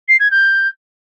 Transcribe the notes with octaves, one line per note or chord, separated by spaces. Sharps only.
C7
G#6
G6